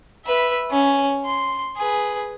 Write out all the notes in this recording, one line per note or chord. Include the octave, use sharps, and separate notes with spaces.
B4 E5
C#4
C6
G#4 B4